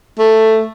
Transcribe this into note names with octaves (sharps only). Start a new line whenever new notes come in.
A3